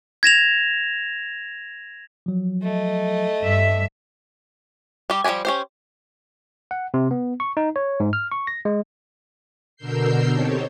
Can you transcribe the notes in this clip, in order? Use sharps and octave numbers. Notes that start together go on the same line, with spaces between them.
G#6 A#6 E7 F7
F3 F#3
A3 D#5
G2 E5
G3 G4
F3 G3 G#3 G4 G#5
C#4 G4 C5
F#5
C3
B3
C#6
D#4
C#5
G#2
F6
C#6
A#6
G#3
B2 D3 A#4 E6 G6 C7
C4 D#4 G4 A4 C#5